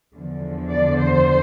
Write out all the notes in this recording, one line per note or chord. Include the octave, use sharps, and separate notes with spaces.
E2 D3 F3
D5
C5